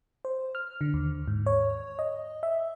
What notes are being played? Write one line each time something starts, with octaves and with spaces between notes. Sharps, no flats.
C5
F6
D3
D#2
G#2
C#5
D#5
E5